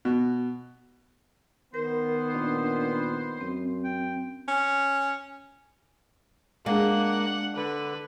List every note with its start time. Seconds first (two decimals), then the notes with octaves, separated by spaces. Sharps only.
0.05 B2
1.74 D#3 B3 A#4 C5
2.34 A#2 D4
3.41 F#2 C4
3.84 G5
4.48 C#4
6.66 G#3 A#3 D4 F#5
7.56 D3 B4